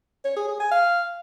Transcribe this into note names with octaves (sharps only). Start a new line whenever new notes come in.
C#5
G#4
G#4
G#5
F5